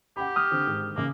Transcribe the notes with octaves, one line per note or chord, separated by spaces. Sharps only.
G4 F#5 G5 B5
D#6 F6
D3 C4
G#2 D#3
C#3 A#3 D6